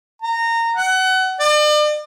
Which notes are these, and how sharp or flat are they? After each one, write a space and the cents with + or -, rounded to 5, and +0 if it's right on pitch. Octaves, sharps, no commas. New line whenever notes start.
A#5 -20
F#5 +25
D5 +40